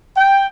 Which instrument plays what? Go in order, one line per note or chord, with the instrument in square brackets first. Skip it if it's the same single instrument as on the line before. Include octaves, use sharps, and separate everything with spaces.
[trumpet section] G5